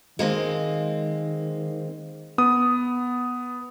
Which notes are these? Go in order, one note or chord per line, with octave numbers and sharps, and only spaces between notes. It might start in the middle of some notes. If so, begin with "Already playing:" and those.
D#3 G#3 A#3 C4
B3 D#6